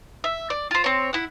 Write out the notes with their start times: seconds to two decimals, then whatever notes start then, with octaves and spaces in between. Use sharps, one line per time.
0.24 E5
0.50 D5
0.71 F4 C5
0.84 C4 C#5
1.13 E4 F#5